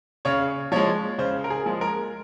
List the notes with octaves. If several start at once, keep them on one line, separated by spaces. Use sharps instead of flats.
C#3 C#5
F3 G#3 C#5
C#3 C5
A#4
G#4
F3 G#3
A#4